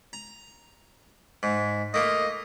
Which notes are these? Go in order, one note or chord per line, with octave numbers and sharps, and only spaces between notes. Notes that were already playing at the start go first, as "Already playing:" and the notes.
A#5
G#2
A3 A#3 F4 D#5